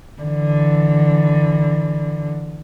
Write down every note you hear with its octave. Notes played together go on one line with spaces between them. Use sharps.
D3 E3